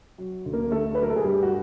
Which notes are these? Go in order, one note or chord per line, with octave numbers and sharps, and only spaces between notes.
F#3
D2
A#3 A#4
D3 A3 A4
B4
F#3 A#4
A4
G#4
G2 G3 G4
F#4